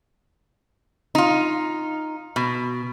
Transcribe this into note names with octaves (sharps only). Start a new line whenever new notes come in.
D#4 F4
B2